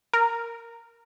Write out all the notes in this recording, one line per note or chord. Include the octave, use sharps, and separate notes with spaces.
A#4